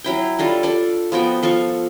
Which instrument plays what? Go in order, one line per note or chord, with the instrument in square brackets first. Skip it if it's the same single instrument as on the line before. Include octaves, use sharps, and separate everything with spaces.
[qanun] F#3 E4 G5
G3 D4 F4 A4
D4 A4 D5
F3 B3 F#4 G5
F3 A4 F5 C#6